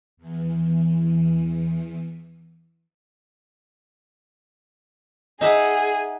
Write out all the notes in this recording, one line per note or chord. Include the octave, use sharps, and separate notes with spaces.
E2 E3
D#4 G#4 E5 F#5